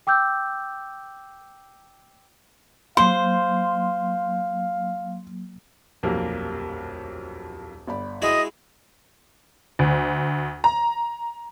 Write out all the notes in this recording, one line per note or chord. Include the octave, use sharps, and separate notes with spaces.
G5 D6 E6 G6
F#3 A#3 C5 F5 C6
D#1 B1 F2 A#3 G4
G1 D5 B5
G#3 E4 F#4 D#5
D2
A#5